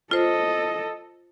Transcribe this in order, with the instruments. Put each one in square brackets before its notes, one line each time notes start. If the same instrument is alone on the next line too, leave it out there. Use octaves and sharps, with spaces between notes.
[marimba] F4 C5 [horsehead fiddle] A4 D#5